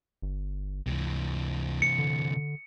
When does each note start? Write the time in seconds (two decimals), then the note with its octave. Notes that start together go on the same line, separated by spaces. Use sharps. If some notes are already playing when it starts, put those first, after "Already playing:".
0.22 G1
0.87 C#2 C3 E3
1.82 C#7
1.99 D3